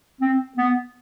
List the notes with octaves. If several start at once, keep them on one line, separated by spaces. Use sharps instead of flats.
C4
B3